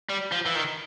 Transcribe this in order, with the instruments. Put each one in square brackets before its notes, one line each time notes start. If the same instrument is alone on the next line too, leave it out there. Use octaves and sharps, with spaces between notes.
[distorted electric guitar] G3
F3
E3
D#3